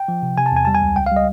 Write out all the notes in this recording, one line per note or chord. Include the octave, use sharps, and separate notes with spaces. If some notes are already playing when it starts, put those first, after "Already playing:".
Already playing: G5
F3
C3
C3 G#5
A5
E2 G#5
G3 A5
G#5
C#2
C#2 G5
F5
G3 D#5